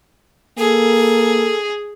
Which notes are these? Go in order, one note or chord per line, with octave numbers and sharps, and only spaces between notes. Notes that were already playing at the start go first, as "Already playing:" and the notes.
A#3 G#4 A4